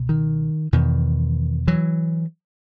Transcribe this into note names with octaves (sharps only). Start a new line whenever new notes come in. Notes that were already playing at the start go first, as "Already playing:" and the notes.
Already playing: C#2 B2
D#3
E2 B2 D#3
E3 F#3